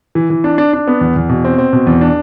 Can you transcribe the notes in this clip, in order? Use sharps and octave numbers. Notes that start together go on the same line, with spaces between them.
E3
E3
D4
D4
D4
B3
E2
E2
B2
C4
C4
B2
E2
D4